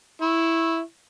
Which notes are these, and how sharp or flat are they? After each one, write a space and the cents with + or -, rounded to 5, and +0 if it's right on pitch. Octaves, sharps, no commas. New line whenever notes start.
E4 +0 C#6 -30